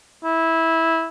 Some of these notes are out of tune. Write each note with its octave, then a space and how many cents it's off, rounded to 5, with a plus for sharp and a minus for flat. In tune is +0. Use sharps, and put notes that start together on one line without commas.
E4 -10